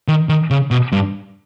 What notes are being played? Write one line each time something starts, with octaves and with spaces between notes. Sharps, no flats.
D#3
D#3
C#3
B2
G2